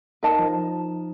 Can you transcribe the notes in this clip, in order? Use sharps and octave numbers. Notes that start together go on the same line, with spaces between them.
D#4 A#4 D#5 A5
F3